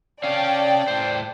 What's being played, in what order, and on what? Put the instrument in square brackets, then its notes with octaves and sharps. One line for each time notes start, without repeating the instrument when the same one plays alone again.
[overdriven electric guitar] C#4 F5 [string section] D5 G5 A5
[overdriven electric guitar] A2 C5